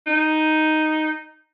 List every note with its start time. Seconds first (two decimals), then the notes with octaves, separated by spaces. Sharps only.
0.07 D#4